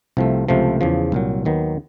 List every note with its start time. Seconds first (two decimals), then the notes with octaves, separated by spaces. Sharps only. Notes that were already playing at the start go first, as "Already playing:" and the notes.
0.17 C2 C3 F3 A3
0.48 C#2 C3 F3 A3
0.81 E2 C#3 F3
1.12 C2 A#2 F#3
1.45 D#2 D#3 F#3 B3